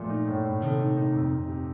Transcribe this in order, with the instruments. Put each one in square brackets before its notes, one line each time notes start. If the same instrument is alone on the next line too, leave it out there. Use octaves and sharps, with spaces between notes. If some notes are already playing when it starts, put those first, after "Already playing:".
Already playing: [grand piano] A#2 [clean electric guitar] F3 A3
[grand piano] D#4
A2
A2
[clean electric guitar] C3 D#3 [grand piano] A3
[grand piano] D#4
D#4
F2
F2
C3